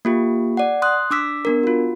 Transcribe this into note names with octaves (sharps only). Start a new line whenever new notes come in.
A#3 F4 G4
D5 F#5
C6 D#6 F#6
D4 D6 E6 B6
B3 D4 A#4
F4 F#4